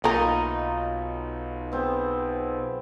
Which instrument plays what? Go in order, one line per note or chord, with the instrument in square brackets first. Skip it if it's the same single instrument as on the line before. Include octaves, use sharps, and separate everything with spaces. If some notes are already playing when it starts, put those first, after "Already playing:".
[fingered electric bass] B1 [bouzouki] A3 D#4 [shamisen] A#3 A#4 [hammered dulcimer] F4 B5
[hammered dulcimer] B3 C4 G#4